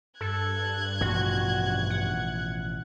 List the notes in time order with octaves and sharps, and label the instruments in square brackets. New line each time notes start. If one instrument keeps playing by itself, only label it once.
[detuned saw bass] G2 [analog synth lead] A4 [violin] F#6 G#6
[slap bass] A1 B2 F3 [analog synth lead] F#4
[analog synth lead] F#5